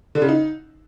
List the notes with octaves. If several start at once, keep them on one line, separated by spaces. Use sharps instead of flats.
D3
C#3
D#4